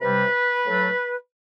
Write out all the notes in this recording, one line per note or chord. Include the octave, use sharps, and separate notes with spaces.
C3 G3 B4
A2 F#3 A3